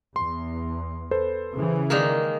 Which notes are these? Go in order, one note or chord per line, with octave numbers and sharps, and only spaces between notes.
E2 C6
A4 B4 C5
C#3 E3
D#3 G#3 A#3 A#4 D5